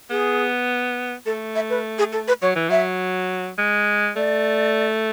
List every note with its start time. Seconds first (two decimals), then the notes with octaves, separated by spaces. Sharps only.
0.10 B3 G#4
1.26 A3 A4
1.55 E5
1.70 B4
1.98 G#4
2.13 A4
2.28 B4
2.42 F#3 C#5
2.55 E3
2.69 F#3 E5
3.58 G#3
4.16 A3 D5